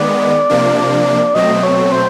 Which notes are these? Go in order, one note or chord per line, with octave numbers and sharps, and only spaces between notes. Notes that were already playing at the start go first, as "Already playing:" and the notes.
Already playing: D#3 G#3 B3 D5
C3 F3 A#3 D4
B2 F#3 A3 C4 D#5
C#5
C5